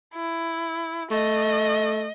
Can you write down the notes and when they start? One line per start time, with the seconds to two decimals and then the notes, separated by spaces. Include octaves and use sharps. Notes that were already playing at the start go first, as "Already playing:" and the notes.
0.15 E4
1.11 A3 D#5